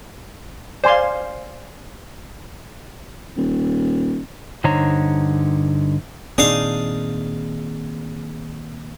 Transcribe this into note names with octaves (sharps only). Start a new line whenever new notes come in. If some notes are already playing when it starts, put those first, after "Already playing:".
C5 D5 F5 G#5 C6
D#1
G2 D3 D#4 C5 C#5 A#5
A#2 D#3 C4 D4 D#4 G#4 F5